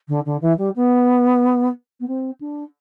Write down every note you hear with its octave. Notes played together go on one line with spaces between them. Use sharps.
D3
D3
E3
G3
B3
B3
C4
D4